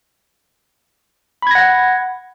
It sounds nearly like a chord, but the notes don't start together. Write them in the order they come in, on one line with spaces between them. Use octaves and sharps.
B5 G#6 A#6 F#5